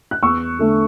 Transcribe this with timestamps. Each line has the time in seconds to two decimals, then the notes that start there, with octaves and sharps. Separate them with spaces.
0.11 F#6
0.23 E2 C#6 E6
0.59 D3 A3